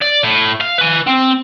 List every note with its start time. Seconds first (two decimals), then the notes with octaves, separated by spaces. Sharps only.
0.02 D5
0.24 A2
0.61 F5
0.78 B4 G#5
1.07 C4